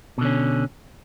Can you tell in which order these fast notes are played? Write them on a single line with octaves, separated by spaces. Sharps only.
B2 D3 C#4